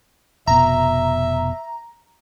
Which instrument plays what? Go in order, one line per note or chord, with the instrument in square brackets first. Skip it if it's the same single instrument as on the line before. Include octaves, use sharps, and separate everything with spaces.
[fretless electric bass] F1 B2 [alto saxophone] E5 [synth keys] A#5